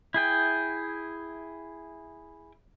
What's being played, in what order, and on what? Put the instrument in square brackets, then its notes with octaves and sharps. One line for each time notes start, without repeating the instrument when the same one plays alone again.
[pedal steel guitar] E4 G#4 G5